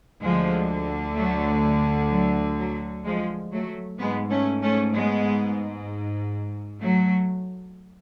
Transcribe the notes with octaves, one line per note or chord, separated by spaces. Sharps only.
D2 D3 F3 G#3
F#3 A3
F#3
F#3
F3 G#3
F#3 A3
G#2 G#3 B3
A3 C#4
A3 C#4
G#3 B3
F#3 A3